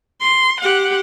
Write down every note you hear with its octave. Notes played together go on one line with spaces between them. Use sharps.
C6
G4 F#5